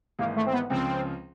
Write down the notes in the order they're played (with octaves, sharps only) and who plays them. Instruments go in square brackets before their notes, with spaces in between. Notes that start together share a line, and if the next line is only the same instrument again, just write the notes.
[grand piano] G#1 G#2 E3 [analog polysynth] A#3
[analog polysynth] A3
C4
B3
[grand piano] C#2 C#3 F3 [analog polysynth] C4